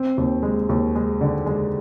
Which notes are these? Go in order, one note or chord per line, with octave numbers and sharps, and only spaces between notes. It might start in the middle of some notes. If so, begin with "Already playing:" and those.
Already playing: C4
D#2
G#3
D#2
G#3
D3
G#3